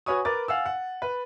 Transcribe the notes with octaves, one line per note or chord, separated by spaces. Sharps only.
F#4 B4 C#5 G#5 C#6 D#6
A#4 B4 D6 A6
F5 F#5 G#5 E6
F#5
B4